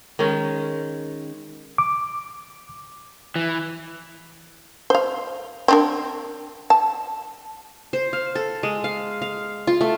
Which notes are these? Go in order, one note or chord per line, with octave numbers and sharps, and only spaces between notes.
D#3 G#3 C#4
D6
E3
C5 F5
C4 D4 A#4
A5
C5
F5
A4
G#3
F5
F5
F4
A3